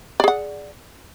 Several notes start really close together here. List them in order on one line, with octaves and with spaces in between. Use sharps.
D5 G#4 F#5